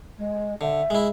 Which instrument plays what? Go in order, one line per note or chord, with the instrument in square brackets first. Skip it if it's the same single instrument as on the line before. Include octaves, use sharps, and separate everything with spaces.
[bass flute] G#3
[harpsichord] D3 [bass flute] E5
[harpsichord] G#3 E4